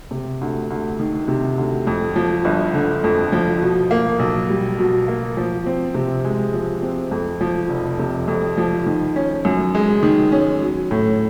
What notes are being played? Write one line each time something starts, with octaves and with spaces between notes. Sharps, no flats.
C3
D2
D2
D#3
C3
D2
F2
F3
G1
D3
F2
F3
B2
A#3
B1
G3
B2
A#3
F3
C4
C3
G#3
F3
C4
F2
F3
F1
C3
F2
F3
D#3
C#4
F#2
G#3
D#3
C#4
F#3
A2